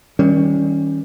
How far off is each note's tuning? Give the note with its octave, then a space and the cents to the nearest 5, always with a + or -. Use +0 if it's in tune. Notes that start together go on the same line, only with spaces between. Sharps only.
D#3 +40 G3 +0 C#4 +0